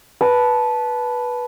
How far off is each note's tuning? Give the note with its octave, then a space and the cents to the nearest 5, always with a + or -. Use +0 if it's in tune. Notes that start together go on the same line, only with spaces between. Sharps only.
B4 -10 A5 -15